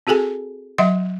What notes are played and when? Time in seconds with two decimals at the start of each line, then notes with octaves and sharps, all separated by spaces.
0.07 C4 F#4 G#4 A4 G#5
0.78 F#3 D#5 E5 F#5 C6